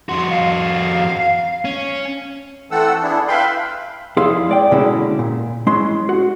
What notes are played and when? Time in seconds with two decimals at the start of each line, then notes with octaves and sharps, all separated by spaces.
0.09 F2 F#4 C6
0.30 F5
1.65 C#4
2.71 E3 A3 C4 A4 F#5 E6
3.03 B3 D4 E4 G#4
3.28 B4 E5 F5 G5 B5 C6
4.17 F2 E4 G#4 E5 F5 C6
4.49 G#3 D5 G5
4.71 B2 D3 G#3 A#3 C#4 E4
5.19 A#2
5.67 G#3 C#4 E4 C6
6.09 F#4